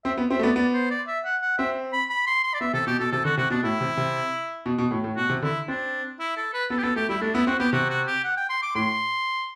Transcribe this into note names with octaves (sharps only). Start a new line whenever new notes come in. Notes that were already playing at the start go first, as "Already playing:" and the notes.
C4 E5
B3
C4 E5
A3
B3 D5
B3 D5
C5
D5
E5
F#5
F#5
C4 E5
B5
B5
C6
C6
D5
B3 E5
C3 A4
B2 G4
B2 A4
C3 A4
D3 F#4
C3 F#4
B2 D4
A2 E4
C3
C3
B2
B2
A2
A2
B2 F#4
C3
D3 E4
C4 D4
E4
A4
B4
B3 A4
G4
B3 A4
A3 G4
G3 E4
A3 D4
B3 E4
C4 F#4
B3 G4
C3 F#4
F#4
G4
F#5
G5
C6
D6
A2 C6